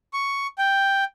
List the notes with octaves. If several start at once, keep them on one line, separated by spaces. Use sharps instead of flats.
C#6
G5